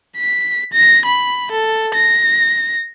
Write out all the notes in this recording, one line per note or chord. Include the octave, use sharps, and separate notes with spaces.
B6
A#6
B5
A4
A#6